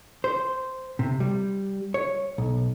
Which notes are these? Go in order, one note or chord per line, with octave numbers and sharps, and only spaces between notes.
C5
C3
G3
C#5
B1